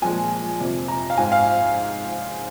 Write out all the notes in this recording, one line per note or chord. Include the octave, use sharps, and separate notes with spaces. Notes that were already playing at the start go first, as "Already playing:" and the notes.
A#2 F3 G#3 G#5
F2 C3 F3 C4
A#5
F5
G#2 G#3 C4 G#5
F5